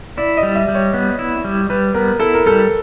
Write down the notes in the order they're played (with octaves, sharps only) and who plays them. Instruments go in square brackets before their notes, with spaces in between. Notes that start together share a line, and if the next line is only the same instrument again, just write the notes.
[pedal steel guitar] E4 [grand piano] D5
[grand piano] D#5
[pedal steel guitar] G3
[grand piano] E5
[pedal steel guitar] G3
[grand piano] C#5
[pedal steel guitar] B3
E4
G3
[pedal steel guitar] G3 [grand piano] B4
[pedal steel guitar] B3 [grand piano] A#4
[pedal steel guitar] E4 [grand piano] A4
[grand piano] A#4
[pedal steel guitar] G3 [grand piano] A4